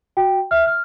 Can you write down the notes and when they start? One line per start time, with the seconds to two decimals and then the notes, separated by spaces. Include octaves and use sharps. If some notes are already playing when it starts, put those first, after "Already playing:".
0.17 F#4 G5
0.51 E5 F6
0.66 F6